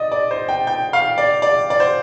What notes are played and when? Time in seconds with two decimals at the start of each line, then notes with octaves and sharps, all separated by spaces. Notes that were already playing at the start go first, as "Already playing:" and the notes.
Already playing: D5 D#5
0.12 D5
0.31 C5
0.49 G5
0.67 G5
0.93 F5
1.18 D5
1.42 D5
1.70 D5
1.80 C5